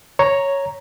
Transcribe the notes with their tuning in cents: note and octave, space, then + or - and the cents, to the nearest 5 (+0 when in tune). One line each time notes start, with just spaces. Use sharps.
C#5 +0 A#5 +0